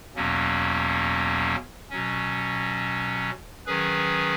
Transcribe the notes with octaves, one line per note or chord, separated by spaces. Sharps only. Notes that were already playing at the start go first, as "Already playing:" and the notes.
E2 B2 F#3 A#3 C#4
B2 F#3 C#4
D#3 F#3 C#4 G#4 B4